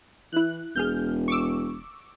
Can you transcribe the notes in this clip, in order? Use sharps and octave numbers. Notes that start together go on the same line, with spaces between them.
E3 E4 F#6
E1 G#4 F6 G6
C#6 D6 E6